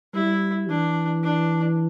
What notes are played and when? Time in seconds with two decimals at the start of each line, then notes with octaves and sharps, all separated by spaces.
0.14 G3 E4
0.69 E3 D4
1.23 D4